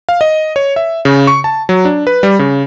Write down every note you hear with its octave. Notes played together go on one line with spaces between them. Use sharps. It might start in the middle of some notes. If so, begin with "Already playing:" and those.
F5
D#5
C#5
E5
C#3
C#6
A5
F#3
D4
B4
G3
C#3